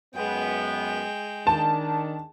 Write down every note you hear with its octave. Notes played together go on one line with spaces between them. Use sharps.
F#2 G#3 B3 G5
D#3 D4 A5